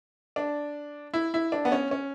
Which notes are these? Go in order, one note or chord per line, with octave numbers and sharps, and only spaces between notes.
D4
E4
E4
D4
B3
C#4
C#4